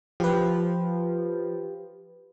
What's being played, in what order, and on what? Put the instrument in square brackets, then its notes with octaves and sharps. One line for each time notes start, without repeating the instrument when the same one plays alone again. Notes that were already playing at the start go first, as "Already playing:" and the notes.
[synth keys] F3 [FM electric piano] G4 B4